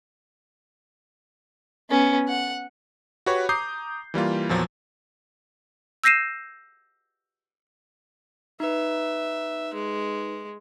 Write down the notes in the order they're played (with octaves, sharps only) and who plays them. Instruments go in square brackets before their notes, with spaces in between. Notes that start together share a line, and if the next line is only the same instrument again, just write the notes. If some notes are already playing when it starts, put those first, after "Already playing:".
[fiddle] B3 C#4
F#5
[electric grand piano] F#4 G4 B4 C#5 C#6
A#5 D6 D#6 G6 C7
E3 G3 A#3 F4
E2 A#2 F3 F#3
[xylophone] E6 G6 A#6 C7 D#7 E7
[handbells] D#4 B4 [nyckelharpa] E5
[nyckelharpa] G#3